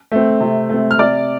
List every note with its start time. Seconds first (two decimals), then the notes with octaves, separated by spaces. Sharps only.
0.12 A3 C4
0.41 C3
0.70 A3 C4
0.91 F6
0.99 C3 D5 D6